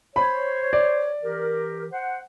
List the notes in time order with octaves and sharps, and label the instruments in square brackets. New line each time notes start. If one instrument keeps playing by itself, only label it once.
[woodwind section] C5 C#5 [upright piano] B5
[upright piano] D5
[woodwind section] E3 G4 A#4
C5 F#5